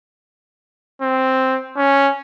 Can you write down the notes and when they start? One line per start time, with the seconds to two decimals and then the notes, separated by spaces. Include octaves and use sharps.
1.02 C4
1.77 C#4